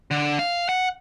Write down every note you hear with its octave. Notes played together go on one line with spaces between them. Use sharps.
D3
F5
F#5